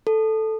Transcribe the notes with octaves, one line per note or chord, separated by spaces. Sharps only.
A4